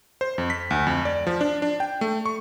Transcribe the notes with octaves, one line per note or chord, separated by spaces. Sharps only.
C5
F2
B6
D2
F2
D5
F3
D4
D4
G5
A3
C#6